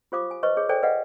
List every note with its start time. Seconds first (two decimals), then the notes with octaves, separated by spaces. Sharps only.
0.12 F4 G4 C5 F5 D6 D#6
0.31 G#5
0.43 B4 C5 D#5 C#6
0.56 G#4 C#5 D#5
0.69 A4 C5 D5 G5 G#5
0.83 B4 D5 D#5 F5 F#5